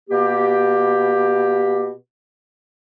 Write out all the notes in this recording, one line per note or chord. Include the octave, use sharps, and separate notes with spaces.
B2 A#3 G4